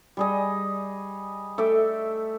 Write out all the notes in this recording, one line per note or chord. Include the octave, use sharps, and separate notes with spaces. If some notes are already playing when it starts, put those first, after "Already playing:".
G3 G#4 D#5
A3 E5 G5 D6